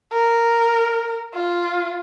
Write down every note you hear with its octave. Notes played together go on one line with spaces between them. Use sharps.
A#4
F4